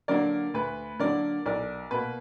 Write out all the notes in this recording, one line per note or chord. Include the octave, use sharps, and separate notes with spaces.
D3 F#3 A#3 D4 A#4 D5
D2 B4
D3 F#3 A#3 D4 A#4 D5
B1 A#4 D5
B2 A#3 B4